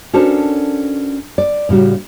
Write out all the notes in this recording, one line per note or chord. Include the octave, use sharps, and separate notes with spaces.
C#4 D4 F#4 A4 A#4 C5
D5
A2 C#3 G3 F#4